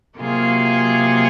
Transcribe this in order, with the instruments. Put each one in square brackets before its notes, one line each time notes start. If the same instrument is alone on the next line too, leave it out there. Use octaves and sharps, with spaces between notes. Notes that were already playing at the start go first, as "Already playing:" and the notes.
[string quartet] C3 F#3 A#3 F4 G#4